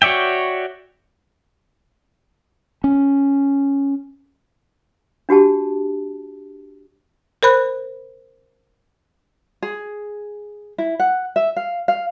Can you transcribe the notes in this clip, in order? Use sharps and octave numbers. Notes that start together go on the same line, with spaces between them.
F#4 C#5 D5 E5 G5
C#4
D4 F#4 G4 A5
A#4 C5 B5 F#6
G#4
E4
F#5
E5
F5
F5